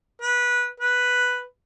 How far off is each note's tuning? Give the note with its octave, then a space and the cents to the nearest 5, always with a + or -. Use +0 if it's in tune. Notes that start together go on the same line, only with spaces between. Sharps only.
B4 -15
B4 +0